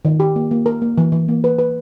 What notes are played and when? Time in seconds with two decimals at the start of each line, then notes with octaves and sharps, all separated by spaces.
0.05 D#3
0.20 G4
0.36 A#3
0.51 A#3
0.66 A#4
0.82 A#3
0.98 E3
1.12 E3
1.28 A#3
1.44 B4
1.59 B4